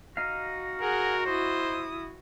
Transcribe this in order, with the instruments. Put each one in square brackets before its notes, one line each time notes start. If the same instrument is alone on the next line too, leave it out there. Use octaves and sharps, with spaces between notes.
[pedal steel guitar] D#4 F5 [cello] F#4
[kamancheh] G#4 F#5 [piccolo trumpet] A#4
[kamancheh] E4 D#6 [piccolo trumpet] C5